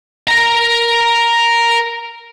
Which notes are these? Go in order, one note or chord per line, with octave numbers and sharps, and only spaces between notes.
A#4 A#5